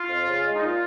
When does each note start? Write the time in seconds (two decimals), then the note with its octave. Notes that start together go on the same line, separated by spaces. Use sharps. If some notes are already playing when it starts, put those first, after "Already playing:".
Already playing: F4
0.08 F2
0.26 C#3
0.44 G#3
0.56 D#4
0.61 A#2 F4